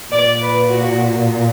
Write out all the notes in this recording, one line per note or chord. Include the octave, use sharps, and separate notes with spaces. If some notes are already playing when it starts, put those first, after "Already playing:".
A#2 D5
B4
F#4